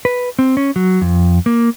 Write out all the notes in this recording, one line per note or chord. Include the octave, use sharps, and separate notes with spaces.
B4
C4
C#4
F#3
F2
A#3